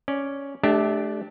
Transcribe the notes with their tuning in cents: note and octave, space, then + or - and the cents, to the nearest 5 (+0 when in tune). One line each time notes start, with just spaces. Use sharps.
C#4 +5 D5 +0
A3 -30 D4 +0 G4 +0